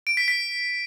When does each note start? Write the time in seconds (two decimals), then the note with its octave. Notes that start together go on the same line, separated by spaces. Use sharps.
0.07 D7
0.17 B6
0.28 B6